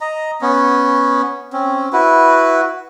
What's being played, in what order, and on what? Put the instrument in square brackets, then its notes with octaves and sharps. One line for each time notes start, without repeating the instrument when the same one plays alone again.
[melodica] D#5 A#5
B3 C#4
C4 C#4
E4 F#4 B4